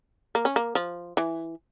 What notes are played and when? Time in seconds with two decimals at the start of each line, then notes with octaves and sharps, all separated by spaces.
0.35 A#3
0.45 C#4
0.56 A#3
0.75 F3
1.17 E3